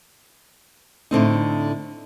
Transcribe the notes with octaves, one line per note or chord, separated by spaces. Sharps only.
A2 D3 C4 D#4